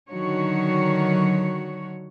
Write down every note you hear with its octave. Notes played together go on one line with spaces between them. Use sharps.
D3 D#3 F#3 F#4 C#5